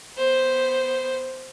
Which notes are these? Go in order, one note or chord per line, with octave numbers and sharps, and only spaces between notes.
B3 C5